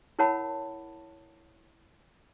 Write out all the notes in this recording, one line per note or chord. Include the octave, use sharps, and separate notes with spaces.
E4 A#4 C#5 F#5 A5 B5